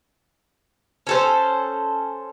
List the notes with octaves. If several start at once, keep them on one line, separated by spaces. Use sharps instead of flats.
C#4 A4 C5